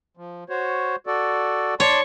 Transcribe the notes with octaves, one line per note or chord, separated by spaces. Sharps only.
F3
F#4 C5 C#5
F#4 A4 D5
C#5 D5 A5 C6